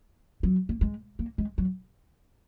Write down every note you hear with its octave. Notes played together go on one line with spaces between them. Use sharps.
F#3
A#3
G#3
A#3
G#3
F#3